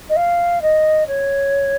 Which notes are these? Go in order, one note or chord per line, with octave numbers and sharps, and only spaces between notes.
D#5
F5
D#5
C#5